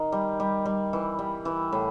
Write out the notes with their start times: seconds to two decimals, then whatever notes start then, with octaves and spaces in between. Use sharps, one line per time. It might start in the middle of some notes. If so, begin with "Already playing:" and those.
Already playing: D#3
0.12 G3
0.40 G3
0.66 G3
0.93 E3
1.19 G3
1.45 E3
1.72 A2